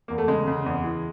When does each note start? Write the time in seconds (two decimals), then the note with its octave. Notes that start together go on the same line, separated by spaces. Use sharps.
0.08 E2 A#3
0.18 A3
0.28 C#3 G#3
0.47 C#3
0.66 E2
0.84 E3